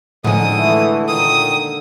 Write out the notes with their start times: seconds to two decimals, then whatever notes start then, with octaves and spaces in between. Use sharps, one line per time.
0.24 A2 D3 D#3 F3 G#3 C#4 D#6
0.58 E3 A3
1.08 A#2 D#3 D#6